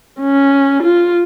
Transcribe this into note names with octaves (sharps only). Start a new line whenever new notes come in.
C#4
F4